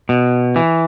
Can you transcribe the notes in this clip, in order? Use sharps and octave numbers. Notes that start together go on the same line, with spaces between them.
B2
E3